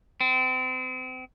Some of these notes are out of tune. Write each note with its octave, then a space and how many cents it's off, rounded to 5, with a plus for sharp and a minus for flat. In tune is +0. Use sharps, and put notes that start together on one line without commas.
C4 -35